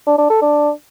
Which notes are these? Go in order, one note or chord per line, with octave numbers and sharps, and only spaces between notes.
D4
D4
A4
D4